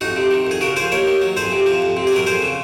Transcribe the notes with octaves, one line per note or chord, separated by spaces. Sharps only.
F2 D#4 F#4
C3
D#3
F2 G#4
C#3 F#4 A#4
F3 G#4 C5
D#2 A#4 C#5
D#3
F#3
F2 G#4 C5
C3
F3
F2
C3
G#4
F#3 A#4
F2 G#4 C5
C#3